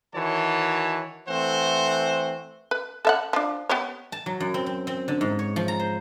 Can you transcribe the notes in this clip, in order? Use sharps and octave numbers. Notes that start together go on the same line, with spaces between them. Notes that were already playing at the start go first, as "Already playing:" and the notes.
D#3 E3 F#4 C#5 A5
E3 A3 C4 C5 F#5
B4
A4 E5 F#5
F3 D4
B3 G4 C#5
A5
F#3
F#2
C4
C4
C4
D3
G#2
C#5
F3
A#5
C5